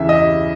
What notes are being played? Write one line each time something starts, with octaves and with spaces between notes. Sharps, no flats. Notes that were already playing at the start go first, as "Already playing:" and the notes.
Already playing: E2 C#3 E3 E5
D#5